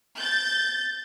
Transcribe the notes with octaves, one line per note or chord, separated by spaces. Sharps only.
G6 A6